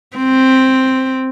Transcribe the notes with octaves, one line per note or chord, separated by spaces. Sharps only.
C4